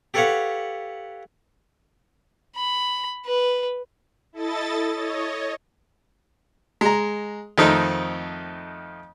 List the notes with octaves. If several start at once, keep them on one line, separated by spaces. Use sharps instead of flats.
G4 A4 B4 C#5 F5 F#5
B5
B4
E4 A4 D#5 A6
C#5 D#5
G#3 A#5
F2 D#3 A3 C4 D#4